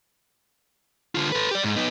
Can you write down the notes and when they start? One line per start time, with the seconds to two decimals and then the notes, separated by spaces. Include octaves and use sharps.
1.15 D3 F4
1.32 A4 B4
1.51 G4 D5
1.64 G#2
1.76 B3 D#4